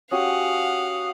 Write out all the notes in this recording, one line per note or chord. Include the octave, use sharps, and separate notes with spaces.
C#4 F#4 G4 F5 F#5 D#6